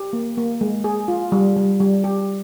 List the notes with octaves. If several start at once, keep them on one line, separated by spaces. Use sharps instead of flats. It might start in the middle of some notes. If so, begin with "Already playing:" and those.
Already playing: G4
A#3
A#3
G#3
G#4
F4
G3
G3
G3
G4